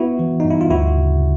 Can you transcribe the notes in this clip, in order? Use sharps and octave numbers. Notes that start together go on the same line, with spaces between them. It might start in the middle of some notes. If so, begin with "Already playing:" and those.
Already playing: B3 E4 F#4
E3
G2 D#4
E4
F4
D2 E4 F#4
C#3